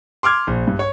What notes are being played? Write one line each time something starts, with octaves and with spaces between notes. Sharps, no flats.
C6 D6 F6 G#6
A#1
G2
C#5